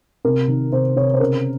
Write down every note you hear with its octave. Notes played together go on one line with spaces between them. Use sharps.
C3 A#4
D#3
C3 C5
C3 C#5
C5
C#3 A#4